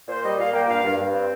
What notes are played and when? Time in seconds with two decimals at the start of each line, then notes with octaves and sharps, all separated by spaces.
0.08 A#2 C5
0.24 G3 D#5
0.38 A#2 F5
0.53 A#3 G5
0.68 G2 F5
0.83 G2
0.98 G2
1.13 C4